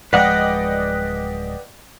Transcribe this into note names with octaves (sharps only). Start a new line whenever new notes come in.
D1 F3 G#3 B4 D5 D#5 F#5 G5